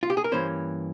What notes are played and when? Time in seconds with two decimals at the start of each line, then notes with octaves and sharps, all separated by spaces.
0.03 F4
0.10 G4
0.17 G#4
0.24 A#4
0.32 G2 E3 A#3 C#4 C5